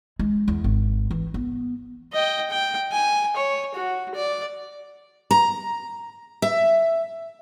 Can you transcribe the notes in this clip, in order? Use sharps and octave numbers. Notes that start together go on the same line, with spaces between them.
G#3
E2
G#1
E3
B3
D#5 G5
G5
G#5
C#5
F#4
D5
A#5
E5